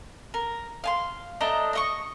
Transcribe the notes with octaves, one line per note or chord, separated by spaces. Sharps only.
A#4
F5 G#5 C6
A3 D4 D#5 A#5
D#5 E5 C#6